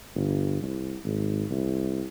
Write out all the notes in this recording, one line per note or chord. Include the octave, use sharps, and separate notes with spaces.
G1
C2
G#1
C2